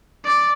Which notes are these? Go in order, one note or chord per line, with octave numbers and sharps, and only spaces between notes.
D5